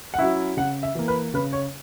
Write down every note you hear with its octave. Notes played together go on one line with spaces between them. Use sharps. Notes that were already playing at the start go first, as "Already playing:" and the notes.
F#5
F#3 C#4 E4 E5
C#3 F#5
E5
E3 A#3
B4
C#3 B4
C#5